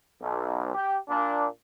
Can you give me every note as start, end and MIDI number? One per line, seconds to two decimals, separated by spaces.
0.22 0.74 35
0.74 0.97 67
1.08 1.46 46
1.08 1.46 58
1.08 1.46 62